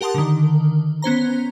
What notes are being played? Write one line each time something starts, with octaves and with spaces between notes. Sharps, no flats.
G4 A#4 F#5 A5 C6 D#6
D3 D#3
B3 C#4 C5 A#5